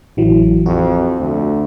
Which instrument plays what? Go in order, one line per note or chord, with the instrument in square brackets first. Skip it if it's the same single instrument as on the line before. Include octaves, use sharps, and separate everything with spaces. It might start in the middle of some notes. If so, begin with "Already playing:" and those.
[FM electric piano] A1 E3 F#3
[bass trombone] F2 [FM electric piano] F#4
[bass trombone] D2